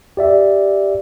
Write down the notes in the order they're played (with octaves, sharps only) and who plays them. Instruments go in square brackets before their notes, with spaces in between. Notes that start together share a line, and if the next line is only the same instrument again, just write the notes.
[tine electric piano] G4 D5 E5